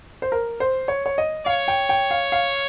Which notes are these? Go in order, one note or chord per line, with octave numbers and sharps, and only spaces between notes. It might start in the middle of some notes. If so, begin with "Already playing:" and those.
C5
A#4
C5
C#5
C#5
D#5
C#5 F5
G5
G5
F5
F5